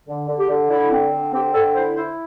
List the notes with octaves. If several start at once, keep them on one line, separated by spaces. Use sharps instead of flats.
D3
D3
G4
D3
D3 E4
C4
D3
C4 G4
D3 A4
E4 C5
E4 C5